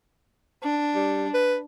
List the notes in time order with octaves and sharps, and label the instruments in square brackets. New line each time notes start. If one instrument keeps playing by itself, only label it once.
[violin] D4
[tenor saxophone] G3
B4